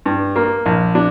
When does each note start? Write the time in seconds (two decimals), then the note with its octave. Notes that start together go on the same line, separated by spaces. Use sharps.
0.06 G2
0.36 A#3
0.66 A#1
0.95 D4